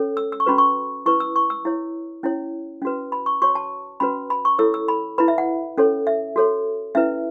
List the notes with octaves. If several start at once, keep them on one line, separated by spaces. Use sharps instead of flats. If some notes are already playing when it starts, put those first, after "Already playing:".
Already playing: C#4 A4 C#5
E6
E6
C#6
C#4 F#4 B4 B5
C#6
E4 B4 C#6
E6
C#6
E6
E4 C#5
C#4 E4 C#5
C#4 F#4 B4
B5
C#6
F#4 C#5 C#6
A5
C#4 F#4 B4 B5
B5
C#6
E4 A4 C#5 E6
E6
B5
E4 B4 B5
E5
F#5
C#4 A4 C#5
E5
F#4 A4 C#5
C#4 E4 B4 E5